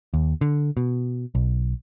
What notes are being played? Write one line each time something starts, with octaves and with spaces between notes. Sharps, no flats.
D#2
D3
B2
B1